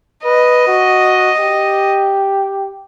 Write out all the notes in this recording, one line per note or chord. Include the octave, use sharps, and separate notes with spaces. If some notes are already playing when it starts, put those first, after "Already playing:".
B4 D#5
F#4
G4